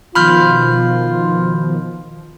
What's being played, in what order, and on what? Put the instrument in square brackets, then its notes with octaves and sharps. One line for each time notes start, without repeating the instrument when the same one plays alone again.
[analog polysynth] B2 D#3 F3 [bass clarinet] F4 [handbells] B5 F6 G6